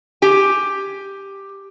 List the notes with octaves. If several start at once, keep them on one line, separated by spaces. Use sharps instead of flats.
G4 G#5